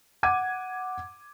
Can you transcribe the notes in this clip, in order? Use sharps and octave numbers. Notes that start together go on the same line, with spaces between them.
F#5 D6 G#6 D#7